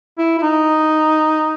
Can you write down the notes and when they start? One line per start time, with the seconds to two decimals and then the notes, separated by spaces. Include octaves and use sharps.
0.18 E4
0.38 E4
0.42 D#4